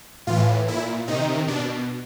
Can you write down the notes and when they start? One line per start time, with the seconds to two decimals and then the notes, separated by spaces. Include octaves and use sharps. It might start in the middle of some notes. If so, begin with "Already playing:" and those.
0.27 A2 E3 F4
0.68 A#2 E4
1.08 C3 D#3 D#4
1.48 B2 D4